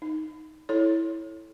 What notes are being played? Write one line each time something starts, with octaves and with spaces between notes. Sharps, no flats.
D#4
E4 A4 C#5